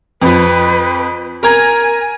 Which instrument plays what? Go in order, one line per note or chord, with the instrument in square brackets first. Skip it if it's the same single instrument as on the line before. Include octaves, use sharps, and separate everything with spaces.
[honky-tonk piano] F2 F3 [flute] B4
[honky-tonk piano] A#4 A#5 G#6 [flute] G#5